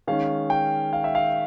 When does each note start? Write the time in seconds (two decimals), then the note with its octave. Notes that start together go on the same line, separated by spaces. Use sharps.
0.07 D#3 G#3 C#4 F5
0.50 G5
0.93 F5
1.04 E5
1.15 F5